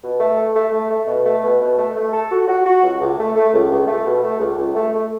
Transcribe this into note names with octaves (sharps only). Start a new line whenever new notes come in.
B2
A3
A4
A3
A3
A3
B2
A3
B2
B2
A3
A3
A4
F#4
F#4
F#4
C#2
C#2
A3
A3
C#2
C#2
A3
B2
A3
C#2
C#2
A3
A3